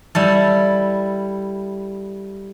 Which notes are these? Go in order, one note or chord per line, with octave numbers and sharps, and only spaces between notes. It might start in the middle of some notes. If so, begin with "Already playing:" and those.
G3 E4 A4